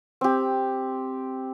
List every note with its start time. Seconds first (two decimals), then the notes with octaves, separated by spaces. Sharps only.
0.21 C4 G4